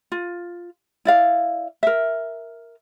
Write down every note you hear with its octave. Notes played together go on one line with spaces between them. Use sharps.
F4
E4 D5 F5
A#4 E5